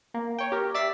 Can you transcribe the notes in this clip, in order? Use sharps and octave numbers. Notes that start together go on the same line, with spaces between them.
A#3
C#5 G5
G4 A#4
D5 E5 A6 B6 C7